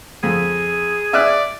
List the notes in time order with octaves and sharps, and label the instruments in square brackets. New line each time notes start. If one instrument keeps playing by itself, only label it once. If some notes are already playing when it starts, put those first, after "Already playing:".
[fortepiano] F2 [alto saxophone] G#4
[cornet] D5 [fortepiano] E5 F6 F#6